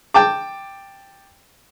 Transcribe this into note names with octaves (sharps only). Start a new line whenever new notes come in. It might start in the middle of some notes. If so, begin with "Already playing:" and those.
G5 A5 D6